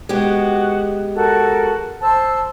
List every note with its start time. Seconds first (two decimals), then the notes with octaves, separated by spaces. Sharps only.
0.09 G#3 B3 F#4 G4
1.15 F#4 A4 A#4
2.01 C5 A5 E6